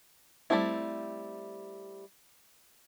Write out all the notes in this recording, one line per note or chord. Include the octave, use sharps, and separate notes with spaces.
G3 A3 A#3 C4 E4